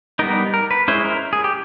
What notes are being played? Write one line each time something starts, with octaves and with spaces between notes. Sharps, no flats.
G3 B3 D#4 A#4
A#4
B4
G#3 C#4 E4 C5
A#4
G#4
G4